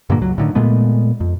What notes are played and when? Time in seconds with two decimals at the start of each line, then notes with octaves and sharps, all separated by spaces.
0.10 G2 A#2 D3 A#3
0.21 C#2 F#3
0.38 A2 D3 D#3
0.55 A#2 G#3 A3 B3
1.20 F2